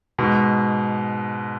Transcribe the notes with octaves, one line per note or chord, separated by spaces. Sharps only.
G#2 B2